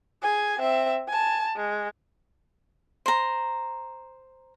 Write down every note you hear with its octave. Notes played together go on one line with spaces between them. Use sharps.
G#4 G#5
C4 E5
G#5 A5
G#3
C5 A#5